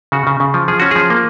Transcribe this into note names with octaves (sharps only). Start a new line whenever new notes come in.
C#3 F#4
C#3
C#3
F3
F3 G#4
C#4 F#4
F3 G#4
A#3